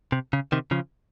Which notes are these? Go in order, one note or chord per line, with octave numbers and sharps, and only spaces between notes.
C3
C#3
C3 D#3
C#3 F3